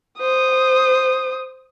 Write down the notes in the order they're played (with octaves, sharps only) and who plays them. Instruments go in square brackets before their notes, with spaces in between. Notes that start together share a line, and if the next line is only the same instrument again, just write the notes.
[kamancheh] C5 D#6